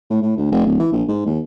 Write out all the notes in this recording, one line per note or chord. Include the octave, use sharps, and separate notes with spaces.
A2
A2
D2
F1
D1
E3
A#1
G#2
D#2